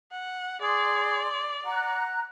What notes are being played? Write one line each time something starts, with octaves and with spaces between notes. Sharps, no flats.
F#5
G#4 D5 C6
F#5 A#5 F#6